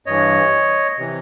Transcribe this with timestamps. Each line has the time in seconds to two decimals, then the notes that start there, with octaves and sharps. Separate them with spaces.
0.06 G2 E3 C#5 D#5
0.98 C3 E3